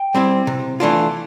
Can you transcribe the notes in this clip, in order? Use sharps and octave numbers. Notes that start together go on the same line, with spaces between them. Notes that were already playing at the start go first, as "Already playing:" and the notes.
Already playing: G5
G3 C4 E4
C3
E3 A3 D4 F4